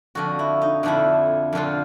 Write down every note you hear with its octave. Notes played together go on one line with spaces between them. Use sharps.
F2 D3 F3 F#4
E4
D#4
F2 D3 F3 E4
F2 D3 F3 F4